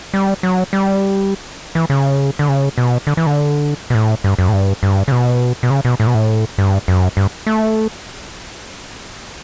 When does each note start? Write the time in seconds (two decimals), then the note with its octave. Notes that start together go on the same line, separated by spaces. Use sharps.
0.14 G3
0.43 F#3
0.73 G3
1.75 E3
1.90 C#3
2.39 D3
2.49 C#3
2.78 B2
3.07 D3
3.17 E3
3.26 D3
3.90 B2
3.95 A2
4.24 G2
4.38 F#2
4.49 A2
4.53 G2
4.83 G2
5.08 C#3
5.12 B2
5.63 B2
5.70 C#3
5.85 B2
6.00 A2
6.07 B2
6.14 A2
6.58 G2
6.88 F#2
7.17 G2
7.47 A3